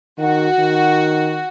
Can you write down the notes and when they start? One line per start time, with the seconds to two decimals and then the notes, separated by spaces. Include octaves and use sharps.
0.18 D#3 F#4
0.59 D#3